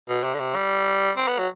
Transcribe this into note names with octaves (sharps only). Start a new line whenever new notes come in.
B2
C3
D3
C3
G3
C4
B3
F#3